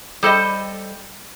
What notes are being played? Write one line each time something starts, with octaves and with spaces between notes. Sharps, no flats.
G3 A4 C5 D#5